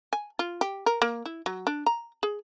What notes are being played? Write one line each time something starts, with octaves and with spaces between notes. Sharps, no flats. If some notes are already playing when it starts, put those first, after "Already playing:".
G#5
F4
G4
A#4
A#3
E4
F#3
D4
A#5
G#4